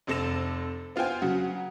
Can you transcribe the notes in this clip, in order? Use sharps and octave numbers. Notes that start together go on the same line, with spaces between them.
F1 C3 A4 A#6 E7
B3 F4 C5 G5 G#5
C#3 F#3 F#5